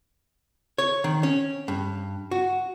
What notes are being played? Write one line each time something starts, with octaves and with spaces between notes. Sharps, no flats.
C#5
D#3
C#4
G2
F#4